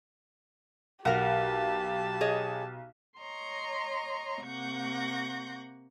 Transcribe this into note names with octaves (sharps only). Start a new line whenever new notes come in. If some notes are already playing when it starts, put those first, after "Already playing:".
B1 G4 A#4 F#5 A5
G#4 C#5 D#5
C#5 D#5 A#5 C6
C3 A#3 F#5 C#6 G6 A#6